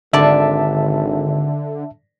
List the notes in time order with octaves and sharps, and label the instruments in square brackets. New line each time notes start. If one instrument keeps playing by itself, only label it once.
[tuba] G#1 [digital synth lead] D3 [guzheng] D5 [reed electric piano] E5 A5